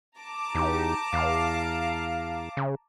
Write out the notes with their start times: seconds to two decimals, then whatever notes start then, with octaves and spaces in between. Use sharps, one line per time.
0.18 A5 A#5 D6
0.55 E2 D#4 G4
1.13 E2 F5
2.57 C#3